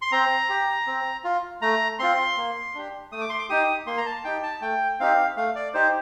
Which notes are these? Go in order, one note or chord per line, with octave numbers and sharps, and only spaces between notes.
C6
C4 A#5
G4
C4
F4
A3 A#5
C4 F4 C6
A#3
D4 G4
A3 D#6
D6
C6
D6
D#4 G4 D#6
A#3 C6
A#5
A5
D#4 G4 G5
A5
A3 G5
C4 D#4 G4 F5
A3 F5
D5
D#4 G4 C5